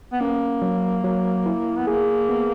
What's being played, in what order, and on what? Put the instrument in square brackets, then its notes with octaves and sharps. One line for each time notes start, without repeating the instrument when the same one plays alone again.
[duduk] B3
[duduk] A#3 [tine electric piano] C#4
[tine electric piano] F#3
F#3
E4
[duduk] B3
[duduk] A#3 [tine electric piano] G#4
[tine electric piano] B3